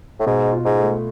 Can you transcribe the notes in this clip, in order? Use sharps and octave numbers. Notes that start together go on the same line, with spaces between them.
A2
G#2 B2
F4
G#2
A3